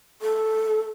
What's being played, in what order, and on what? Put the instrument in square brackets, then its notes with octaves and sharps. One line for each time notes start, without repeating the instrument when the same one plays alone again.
[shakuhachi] A4